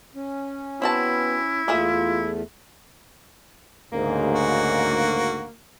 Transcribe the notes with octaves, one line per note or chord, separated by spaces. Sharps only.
C#4
B3 C4 E4 F#4 A5
E2 A3 A#3 F4 G#4 E5
D2 G#2 C#3 A#3
F#4